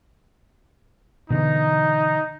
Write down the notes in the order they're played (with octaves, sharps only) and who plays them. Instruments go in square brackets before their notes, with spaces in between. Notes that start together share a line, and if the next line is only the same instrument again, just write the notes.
[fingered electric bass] B2 D3 E3 [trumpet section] D#4